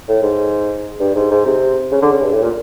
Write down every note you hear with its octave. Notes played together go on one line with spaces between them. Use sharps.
A2
G#2
G2
G#2
G#2
C3
C#3
D3
C#3
G2
A2
A#2